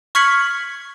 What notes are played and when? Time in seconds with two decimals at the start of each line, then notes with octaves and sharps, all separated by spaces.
0.15 C#6 F6 G#6 B6 C#7 F#7